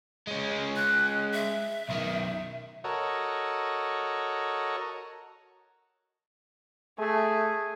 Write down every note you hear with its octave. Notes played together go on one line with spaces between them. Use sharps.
G#3 C#4
F#6
E5
B1 D#3
F#4 A4 A#4 C#5 D#5
A3 G#4